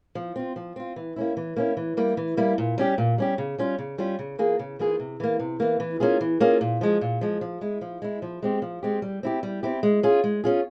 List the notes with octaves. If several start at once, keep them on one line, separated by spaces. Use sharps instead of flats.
F3
C4 F4
F3
C4 F4
E3
A#3 C#4 E4
E3
A#3 C#4 E4
E3
G3 A#3 E4
E3
G3 A#3 E4
A#2
G3 C#4 G4
A#2
G3 C#4 G4
C#3
G3 C#4 F4
C#3
G3 C#4 F4
C#3
E3 A#3 F4 G#4
C#3
E3 A#3 F4 G#4
C3
E3 A#3
C3
E3 A#3
E3
A#3 C#4 F4 G#4
E3
A#3 C#4 F4 G#4
A#2
F3 G#3
A#2
F3 G#3
F3
G#3 E4
F3
G#3 E4
F3
G#3 C4 G4
F3
G#3 C4 G4
G3
C4 E4 G4
G3
C4 E4 G4
G#3
C#4 F4 G#4
G#3
C#4 F4 G#4